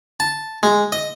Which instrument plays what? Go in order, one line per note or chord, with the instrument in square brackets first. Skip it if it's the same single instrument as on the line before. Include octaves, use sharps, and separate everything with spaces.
[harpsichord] A5
G#3
D#5